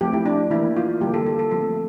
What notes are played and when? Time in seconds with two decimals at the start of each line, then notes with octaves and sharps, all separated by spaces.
0.01 F3 A3 C4 G4
0.13 E4
0.26 D4
0.51 E3 A#3 E4
0.76 F4
1.01 D3 G3 A#3 G4
1.14 A4
1.26 A4
1.39 A4
1.51 F3 A3 C4 A4